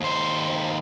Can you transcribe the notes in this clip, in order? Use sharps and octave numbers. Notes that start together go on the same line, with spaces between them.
D#2 C5